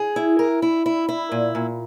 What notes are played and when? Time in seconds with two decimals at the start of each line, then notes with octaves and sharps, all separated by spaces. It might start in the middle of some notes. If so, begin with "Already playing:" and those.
Already playing: G#4
0.16 E4
0.39 A#4
0.62 E4
0.86 E4
1.09 E4
1.32 A#2
1.55 A#2